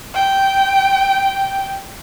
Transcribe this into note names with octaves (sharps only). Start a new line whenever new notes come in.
G5